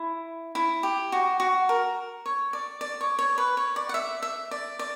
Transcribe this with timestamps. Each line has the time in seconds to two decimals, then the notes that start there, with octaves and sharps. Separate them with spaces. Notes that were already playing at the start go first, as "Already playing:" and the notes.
Already playing: E4
0.55 E4
0.83 G4
1.12 F#4
1.40 F#4
1.69 A#4
2.26 C#5
2.53 D5
2.81 D5
3.01 C#5
3.19 C#5
3.38 B4
3.57 C#5
3.76 D5
3.89 F#5
3.94 E5
4.22 E5
4.51 D5
4.79 D5